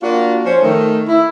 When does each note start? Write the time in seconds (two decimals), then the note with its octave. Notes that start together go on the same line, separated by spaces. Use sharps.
0.03 A#3 D4 F4 F#4
0.46 F3 C#4 C5
0.62 D#3 A3
1.07 E4